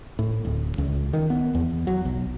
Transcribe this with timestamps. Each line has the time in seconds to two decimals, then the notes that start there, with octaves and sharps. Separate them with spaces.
0.19 A2
0.45 D1
0.78 C#2
1.13 D#3
1.30 B3
1.55 E2
1.87 F#3
2.05 B1